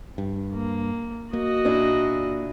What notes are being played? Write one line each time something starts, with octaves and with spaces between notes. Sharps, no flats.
G2
A#3
A#3 F#4 D#5
A#2 D4 E4